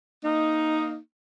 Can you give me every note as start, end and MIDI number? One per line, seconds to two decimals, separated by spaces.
0.23 0.97 58
0.23 0.97 63